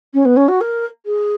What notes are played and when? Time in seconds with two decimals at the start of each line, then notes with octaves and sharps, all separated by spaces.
0.14 C#4
0.25 B3
0.36 C#4
0.48 F#4
0.61 A#4
1.06 G#4